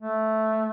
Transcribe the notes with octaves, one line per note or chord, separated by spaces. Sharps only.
A3